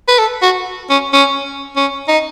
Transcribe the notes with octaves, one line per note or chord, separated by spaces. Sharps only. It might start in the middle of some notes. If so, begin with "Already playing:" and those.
B4
A4
F#4
C#4
C#4
C#4
D#4